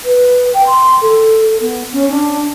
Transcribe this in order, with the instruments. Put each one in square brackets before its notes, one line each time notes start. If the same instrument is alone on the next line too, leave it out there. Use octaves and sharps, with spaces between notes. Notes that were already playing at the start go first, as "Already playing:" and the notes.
[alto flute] B4
G5
C6
A4
B3
C#4
D4